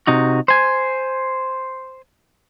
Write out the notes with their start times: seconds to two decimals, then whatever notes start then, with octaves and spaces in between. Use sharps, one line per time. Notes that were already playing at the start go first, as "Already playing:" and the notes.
0.07 C3 D#4 F#4
0.48 C5 G#5